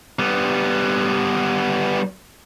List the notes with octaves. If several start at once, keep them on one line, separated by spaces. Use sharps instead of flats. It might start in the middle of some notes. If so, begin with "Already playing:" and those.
G3 B3